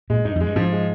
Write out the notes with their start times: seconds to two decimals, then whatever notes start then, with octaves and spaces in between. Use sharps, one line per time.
0.10 A#2 G#3
0.25 G2 D#4
0.36 F2
0.40 G#3
0.46 G2
0.56 G#2 F3
0.72 G#3